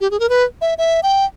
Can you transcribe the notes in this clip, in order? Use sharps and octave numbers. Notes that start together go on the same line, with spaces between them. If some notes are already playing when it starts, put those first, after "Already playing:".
G4
G#4
A#4
B4
E5
E5
G5